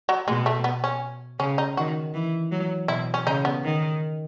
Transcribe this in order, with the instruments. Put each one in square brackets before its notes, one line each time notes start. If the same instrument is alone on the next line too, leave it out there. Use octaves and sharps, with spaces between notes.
[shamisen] F#3
[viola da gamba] B2 [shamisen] G#3
[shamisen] A3
B3
C#4
[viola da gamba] C#3 [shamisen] C#4
[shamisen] D#4
[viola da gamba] D#3 [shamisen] F#4
[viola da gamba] E3
F#3
[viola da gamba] B2 [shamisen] E4
[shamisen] C#4
[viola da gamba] C#3 [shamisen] D#4
[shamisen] B3
[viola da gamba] D#3